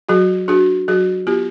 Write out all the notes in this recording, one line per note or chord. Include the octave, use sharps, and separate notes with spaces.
F#3 F#4 G#4
D4 F#4 G#4
F#3 F#4 G#4
B3 F4 G4